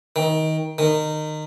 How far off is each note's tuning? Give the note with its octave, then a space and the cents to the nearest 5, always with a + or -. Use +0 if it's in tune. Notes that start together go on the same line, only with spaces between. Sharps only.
D#3 +20
D#3 -20